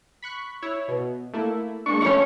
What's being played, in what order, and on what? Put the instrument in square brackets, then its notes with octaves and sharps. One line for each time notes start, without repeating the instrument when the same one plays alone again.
[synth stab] B5 C#6 F#6
E4 C#5
B2
A3 A#3 E4
[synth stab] G#3 A#3 D4 [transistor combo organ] C#6
[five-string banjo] A3 C#4 [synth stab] F4